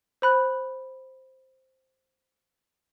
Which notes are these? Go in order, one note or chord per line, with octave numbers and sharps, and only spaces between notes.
C5 B5 F#6